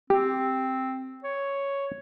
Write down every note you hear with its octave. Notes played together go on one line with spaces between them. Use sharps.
C4 G4
C#5